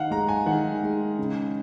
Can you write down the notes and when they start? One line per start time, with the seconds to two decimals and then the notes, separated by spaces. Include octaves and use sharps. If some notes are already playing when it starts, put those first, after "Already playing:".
Already playing: D#3 F5 F#5
0.10 G#3 A#5
0.29 G#5
0.46 D#3 F#5
0.83 G#3
1.18 C#3